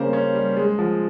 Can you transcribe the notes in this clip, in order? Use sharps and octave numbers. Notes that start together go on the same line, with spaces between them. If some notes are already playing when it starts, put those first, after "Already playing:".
Already playing: C#3 G3 A#3 C#4 C5
C#4
G3
G#3
F3